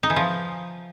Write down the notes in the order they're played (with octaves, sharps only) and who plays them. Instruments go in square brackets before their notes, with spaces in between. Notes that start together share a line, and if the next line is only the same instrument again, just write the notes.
[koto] D#4
E3
F3